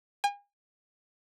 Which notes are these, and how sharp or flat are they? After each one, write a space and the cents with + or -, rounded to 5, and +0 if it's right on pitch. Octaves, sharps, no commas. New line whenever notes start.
G#5 -40